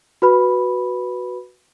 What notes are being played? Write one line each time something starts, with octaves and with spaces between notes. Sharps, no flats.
F#4 B4 B5